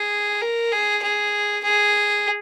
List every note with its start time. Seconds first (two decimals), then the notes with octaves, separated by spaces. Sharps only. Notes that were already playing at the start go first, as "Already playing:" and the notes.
Already playing: G#4
0.41 A#4
0.72 G#4
1.03 G#4
1.64 G#4